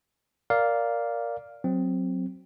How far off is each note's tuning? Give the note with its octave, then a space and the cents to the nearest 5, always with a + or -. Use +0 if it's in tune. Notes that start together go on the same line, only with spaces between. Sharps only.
A#4 +0 D5 -10 F5 +0
F#3 +0 C4 +0